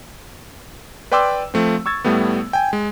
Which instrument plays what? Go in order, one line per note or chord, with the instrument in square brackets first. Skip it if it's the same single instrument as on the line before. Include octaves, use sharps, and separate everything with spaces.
[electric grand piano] B4 D5 G5 C6 D6 E6
F3 A3 C4
C#6 E6 G#6 A6
A2 G3 A3 B3
G5 G#5
G#3